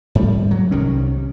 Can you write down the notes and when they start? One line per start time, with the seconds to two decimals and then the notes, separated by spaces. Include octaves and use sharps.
0.15 G#2 G3
0.51 F#3
0.71 C2 C3 D#3 C#4